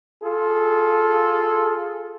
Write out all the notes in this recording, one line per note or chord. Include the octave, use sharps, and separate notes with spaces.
F4 G#4 A4